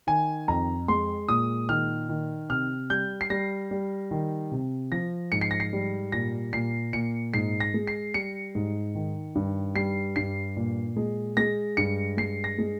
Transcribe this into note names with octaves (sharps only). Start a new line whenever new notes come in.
D#3 G#5
F2 A#5
G#3 C6
A#2 D#6
D#3 F6
D#3
C3 F6
G3 G6
C7
G3 A#6
G3
D#3
C3
F3 A#6
G#2 C#7
C7
A#6
C7
G3
A#2 A#6
A#2 C7
A#2 C#7
G#2 C7
A#6
G#3
C7
G3 C#7
G#2
D#3
G2
G3 C7
G2 C7
A#2
G#3
G#3 A#6
G2 C#7
G#3 C7
A#6
G#3